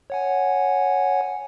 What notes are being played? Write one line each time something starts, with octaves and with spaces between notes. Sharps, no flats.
C#5 F#5 G#5